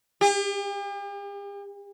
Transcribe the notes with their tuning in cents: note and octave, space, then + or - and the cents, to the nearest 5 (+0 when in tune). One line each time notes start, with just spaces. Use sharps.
G4 +45